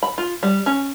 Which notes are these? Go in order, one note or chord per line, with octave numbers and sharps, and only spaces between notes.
B5
F4
G3
C#4